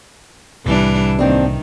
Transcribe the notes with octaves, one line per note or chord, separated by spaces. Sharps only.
C2 A2 E3 G3 D4
D#2 D#3 C4 D4